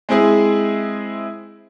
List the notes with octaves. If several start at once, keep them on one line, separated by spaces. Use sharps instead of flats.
G#3 C4 E4 G#4